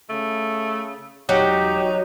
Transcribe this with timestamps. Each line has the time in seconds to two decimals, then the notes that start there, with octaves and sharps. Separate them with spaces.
0.09 C#3 A3
1.29 E1 F#3 D#4 G4